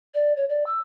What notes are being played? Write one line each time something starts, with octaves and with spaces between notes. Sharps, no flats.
D5
C#5
D5
E6